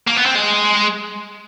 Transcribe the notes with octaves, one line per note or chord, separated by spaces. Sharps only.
A#3
B3
C4
G#3